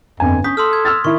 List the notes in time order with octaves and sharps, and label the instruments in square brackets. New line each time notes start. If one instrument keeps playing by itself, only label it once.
[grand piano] G1 G#5 [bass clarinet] F2
[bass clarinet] C#4 [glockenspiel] D#6 B6 [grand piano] G6
[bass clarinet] A4 [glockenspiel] C6 D#6 F6
[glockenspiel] G#6
[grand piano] E6 F6 A6
[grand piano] D#3 E4 [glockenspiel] C#6